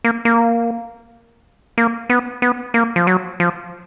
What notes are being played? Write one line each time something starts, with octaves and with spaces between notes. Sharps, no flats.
A#3
A#3
A#3
B3
B3
A#3
F3
F#3
F3